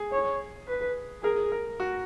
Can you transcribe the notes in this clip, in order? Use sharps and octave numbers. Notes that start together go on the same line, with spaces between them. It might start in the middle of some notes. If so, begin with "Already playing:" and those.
Already playing: G#4
C#5
B4
G#4 A#4
A#4
F#4